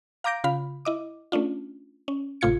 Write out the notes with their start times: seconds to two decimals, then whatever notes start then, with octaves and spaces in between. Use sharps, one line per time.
0.24 F5 A#5 D6 G6 A#6 D7
0.44 C#3 F4 F5 B5
0.85 E4 D#5 D6
1.32 A3 C#4 D4 F4
2.08 C#4
2.41 G#1 A2 C3 F4 G#6 C#7